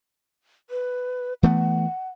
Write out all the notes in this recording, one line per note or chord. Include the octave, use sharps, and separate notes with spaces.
B4
E3 A3 B3 F#5